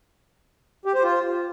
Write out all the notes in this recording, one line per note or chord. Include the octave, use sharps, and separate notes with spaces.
G4
C5
F4